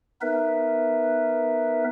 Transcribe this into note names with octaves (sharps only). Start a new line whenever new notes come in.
B3 D#4 A#4 B4 E5